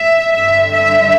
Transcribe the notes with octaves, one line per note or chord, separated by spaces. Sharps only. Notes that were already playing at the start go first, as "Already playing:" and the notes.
Already playing: E5
G2 D3 G3 E5
E5